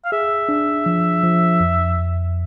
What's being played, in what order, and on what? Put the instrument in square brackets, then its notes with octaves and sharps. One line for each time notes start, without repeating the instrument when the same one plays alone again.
[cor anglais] F5
[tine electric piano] G#4 [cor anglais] E5
[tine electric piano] D4
F3
F3
F2
F2